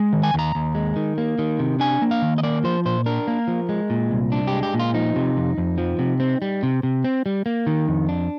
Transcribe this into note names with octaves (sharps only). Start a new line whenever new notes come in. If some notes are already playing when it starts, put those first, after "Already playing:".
Already playing: G#3
D#3
G#5
D#2 A#5
D#2
G#3
D#3
A#3
D#3
C3
D4 G#5
A#3
F5
D#3
D#5
A#3 D5
F3 C5
A#2 C5
D4 A#4
A#3
F3
G#3
A#2
C2
D4
G4
G#3
G4
A#2
F4
F3 D#4
C3
F2
F2
F3
C3
C4
G3
C3
C3
C4
G3
A#3
D#3
F2
D4